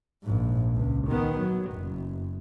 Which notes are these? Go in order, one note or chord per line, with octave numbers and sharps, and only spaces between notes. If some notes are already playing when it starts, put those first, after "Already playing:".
A#1 G#2
C#2
D#3 B3
F#3
F#1